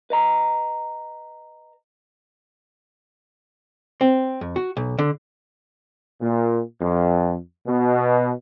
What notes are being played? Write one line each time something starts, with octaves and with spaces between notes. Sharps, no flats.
B4 D#5 A#5
C4
F2
F#4
B1
D3
A#2
F2
B2